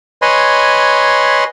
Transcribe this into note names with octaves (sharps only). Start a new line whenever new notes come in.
B4 C#5 D#5 G#5 B5 C6